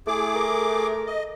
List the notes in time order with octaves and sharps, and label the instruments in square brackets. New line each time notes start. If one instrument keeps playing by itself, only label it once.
[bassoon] A3 [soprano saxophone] E4 [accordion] G#4 D6
[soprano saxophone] A#4
[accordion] D#5